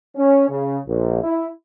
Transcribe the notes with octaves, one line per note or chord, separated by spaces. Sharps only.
C#4
C#3
A#1
E4